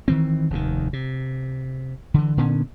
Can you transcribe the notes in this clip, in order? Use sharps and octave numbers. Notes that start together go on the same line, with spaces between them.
D#3 E3 C4
F1 D#2 G#2 D#3
C3
D3 E3
A#2 D3 B3 C#4